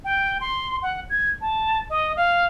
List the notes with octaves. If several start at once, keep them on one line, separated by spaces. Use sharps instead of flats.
G5
C6
F#5
G#6
A5
D#5
F5